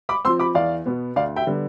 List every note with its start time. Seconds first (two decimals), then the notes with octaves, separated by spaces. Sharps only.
0.09 B5 D6
0.25 F3 C4 C6 E6
0.39 B5 D6
0.54 E2 D5 F5
0.86 B2 B3
1.16 D2 D5 F5
1.36 E5 G5
1.47 D3 G3 B3